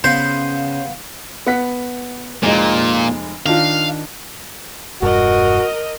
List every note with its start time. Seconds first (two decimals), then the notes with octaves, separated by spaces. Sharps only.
0.04 C#3 B3 C5 F5 C6
1.47 B3 F#5 B6
2.43 F1 A#2 G#3
3.46 D#3 D4 F4 F5
5.02 E1 G2 F#4 A#4 D#5